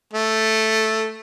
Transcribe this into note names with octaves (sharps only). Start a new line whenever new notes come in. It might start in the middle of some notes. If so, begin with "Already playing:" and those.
A3